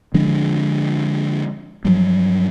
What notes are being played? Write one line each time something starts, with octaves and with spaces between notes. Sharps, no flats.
D3 F3 G#3 D4
G2 F3 F#3